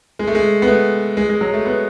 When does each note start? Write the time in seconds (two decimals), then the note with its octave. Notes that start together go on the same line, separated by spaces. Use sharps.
0.19 G#3
0.27 A3
0.35 G#3
0.62 B3
0.68 A3
1.17 G#3
1.29 G#3
1.41 F#3
1.53 A3
1.66 B3